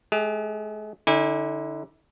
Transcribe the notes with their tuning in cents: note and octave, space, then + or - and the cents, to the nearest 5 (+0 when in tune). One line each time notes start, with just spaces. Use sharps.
G#3 +45 G#4 -30
D3 +0 E4 -45 G#5 -30